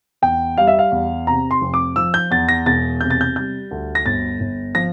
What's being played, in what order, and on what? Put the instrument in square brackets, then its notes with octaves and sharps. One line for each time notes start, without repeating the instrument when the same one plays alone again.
[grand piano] E2 G5
G3 F5
E5
F5
E2
C3 A#5
C6
F1
D6
F3 E6
G6
E2 A6
A#6
E1 A6
C3 G6
A6
G6
G3 G6
D2
A#6
G1 A6
G1
F3 A#6